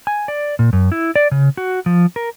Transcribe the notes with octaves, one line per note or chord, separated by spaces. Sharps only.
G#5
D5
A#2
F#2
E4
D5
C#3
F#4
F3
A#4